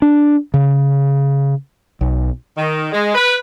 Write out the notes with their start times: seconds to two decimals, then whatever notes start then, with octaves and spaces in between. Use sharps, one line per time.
0.02 D4
0.54 C#3
2.01 B1
2.57 D#3
2.93 G#3
3.15 B4